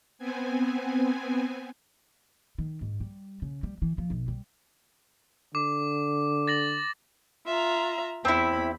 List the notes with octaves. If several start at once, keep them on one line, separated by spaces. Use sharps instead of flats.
B3 C4 G#5
D#3
G#2
G3
C#3
G3
E3
F3
B1
G3
D3 D6
A6 A#6 F#7
F4 E5 A#5
E2 C4 E4 B5